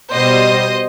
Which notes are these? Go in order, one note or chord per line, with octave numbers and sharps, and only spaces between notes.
B2 G3 C5 D#5